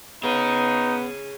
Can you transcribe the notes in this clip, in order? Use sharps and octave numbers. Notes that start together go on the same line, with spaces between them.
B3 D#4 G#4 C#5